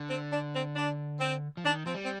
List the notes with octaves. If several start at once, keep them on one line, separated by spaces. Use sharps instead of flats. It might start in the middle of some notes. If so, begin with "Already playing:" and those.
Already playing: D3
C4
D4
C4
D4
C4
F3
D#3 D4
F3 C4
G3
C4